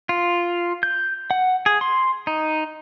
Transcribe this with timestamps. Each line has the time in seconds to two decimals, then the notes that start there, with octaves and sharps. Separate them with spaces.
0.09 F4
0.83 G6
1.31 F#5
1.66 G#4
1.81 C6
2.27 D#4